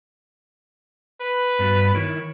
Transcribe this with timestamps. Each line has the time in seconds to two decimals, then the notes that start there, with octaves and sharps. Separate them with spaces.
1.21 B4
1.59 G2 B3 F#4
1.95 D#3 E4 A#4 C#5